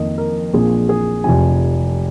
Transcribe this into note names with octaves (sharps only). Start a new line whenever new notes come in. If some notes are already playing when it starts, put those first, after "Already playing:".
Already playing: F2 D#3 A#3 D#5
A#4
A#1 A#2 F3 C4 G#4
G#4
F1 F2 C3 F3 G#5